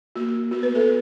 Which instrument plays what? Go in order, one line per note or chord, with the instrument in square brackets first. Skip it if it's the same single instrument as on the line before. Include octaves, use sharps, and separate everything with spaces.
[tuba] A#3 [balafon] F#4
[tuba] B3 [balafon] F#4
[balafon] B4
A4